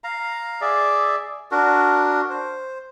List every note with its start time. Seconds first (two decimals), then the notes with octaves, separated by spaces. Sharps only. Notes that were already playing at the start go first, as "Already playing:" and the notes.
0.04 F5 A#5
0.61 G#4 D5 E5
1.51 D4 F#4 A#4
2.30 C5